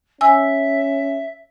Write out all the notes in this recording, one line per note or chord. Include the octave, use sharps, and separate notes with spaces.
C#4 E5 G#5 E6